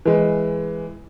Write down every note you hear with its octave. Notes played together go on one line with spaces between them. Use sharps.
E3 G#3